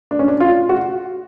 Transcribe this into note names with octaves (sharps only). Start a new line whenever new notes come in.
D4
C#4
D4
F4
F#4